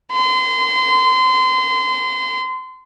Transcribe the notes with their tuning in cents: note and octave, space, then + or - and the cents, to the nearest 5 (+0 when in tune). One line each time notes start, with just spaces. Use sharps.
C6 -30